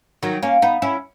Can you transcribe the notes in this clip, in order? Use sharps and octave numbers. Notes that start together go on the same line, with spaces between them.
D#3 F#3
A#3 C#4
B3 D#4
C#4 E4